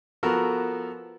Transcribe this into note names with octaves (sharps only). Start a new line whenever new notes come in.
F3 B3 F#4 A4 A#4